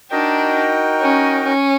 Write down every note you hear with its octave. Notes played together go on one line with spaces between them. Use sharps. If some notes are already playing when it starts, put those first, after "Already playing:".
D4 D#4 F#4 A#4 D#5 G5
C#4
C#4